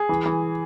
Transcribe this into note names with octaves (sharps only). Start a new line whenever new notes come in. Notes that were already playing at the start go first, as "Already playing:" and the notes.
Already playing: G#4
E3
E3